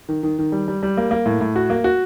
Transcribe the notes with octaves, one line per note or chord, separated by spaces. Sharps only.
D#3
D#3
D#3
G3
G3
G3
A#3
A#3
A2
A2
F#4
A#3
F#4